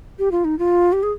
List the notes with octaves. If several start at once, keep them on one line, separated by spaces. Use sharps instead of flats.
G4
F4
D#4
F4
G4
G#4